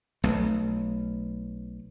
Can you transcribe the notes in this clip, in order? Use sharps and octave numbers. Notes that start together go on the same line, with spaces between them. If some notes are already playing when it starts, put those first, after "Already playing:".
B1 A3